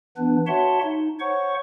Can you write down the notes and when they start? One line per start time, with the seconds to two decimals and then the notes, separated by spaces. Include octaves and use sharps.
0.17 E3 B3 D4 B4
0.47 F#4 C#5 E5 F#5 A5 C6
0.82 D#4
1.20 C5 C#5 F#5 C#6